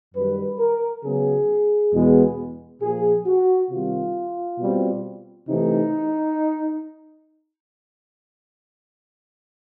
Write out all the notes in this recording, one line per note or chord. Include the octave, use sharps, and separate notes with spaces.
F#2 D#3 G3 B4
A#4
C#3 F#3 B3 G#4
E2 B2 G#3 B3
A#2 F3 A#3 G#4
F#4
C3 D#3 G3 C4 F4
B2 G3 C4
C3 E3 A3 D#4